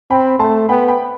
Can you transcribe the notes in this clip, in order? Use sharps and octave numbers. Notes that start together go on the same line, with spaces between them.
C4 G5 B5
A3 A5 C6
B3 G5 B5
G5 B5